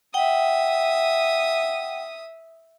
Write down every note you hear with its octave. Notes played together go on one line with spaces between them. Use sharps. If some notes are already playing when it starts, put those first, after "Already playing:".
E5 F#5 G5 D#6